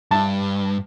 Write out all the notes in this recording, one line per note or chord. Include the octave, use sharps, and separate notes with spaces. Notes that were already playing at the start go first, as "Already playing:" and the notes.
G2 A5